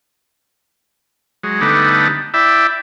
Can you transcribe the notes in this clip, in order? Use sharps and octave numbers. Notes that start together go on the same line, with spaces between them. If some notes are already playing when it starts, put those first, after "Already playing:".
F#3 G#3
D3 G3 A3 B3 D#4
E4 D5 E5 G5